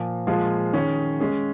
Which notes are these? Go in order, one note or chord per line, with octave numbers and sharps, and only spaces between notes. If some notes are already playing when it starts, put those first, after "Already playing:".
Already playing: A#2 F3 A#3
A#2 F3 G#3 F4 G#4
D#3 C#4 G#4 C#5
G#3 C#4 G#4